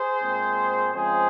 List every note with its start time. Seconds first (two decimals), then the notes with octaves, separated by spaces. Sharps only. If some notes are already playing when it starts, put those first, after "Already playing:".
Already playing: G#4 C5
0.20 A#2 G#3 C4
0.93 C#3 F3 G#3 C4 G#4 C5